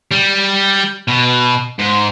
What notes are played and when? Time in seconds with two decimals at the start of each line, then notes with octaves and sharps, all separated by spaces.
0.11 G3
1.08 B2
1.79 G#2